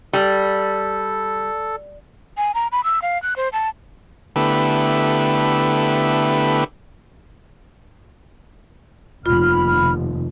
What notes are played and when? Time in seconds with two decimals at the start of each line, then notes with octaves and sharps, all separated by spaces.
0.13 G3 A4
2.37 G#5
2.55 A#5
2.72 B5
2.84 E6
3.02 F5
3.23 F#6
3.36 C5
3.53 A5
4.36 D3 A3 B3 E4 G4 B4
9.26 F1 D#2 F4 B5 F6